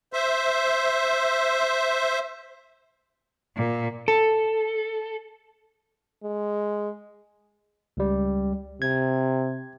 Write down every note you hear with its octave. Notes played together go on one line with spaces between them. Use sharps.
C5 E5
A#2
A4
G#3
C#2 G3
C3 G#6